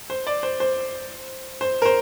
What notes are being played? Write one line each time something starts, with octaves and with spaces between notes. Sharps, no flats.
C5
D5
C5
C5
C5
A#4
C5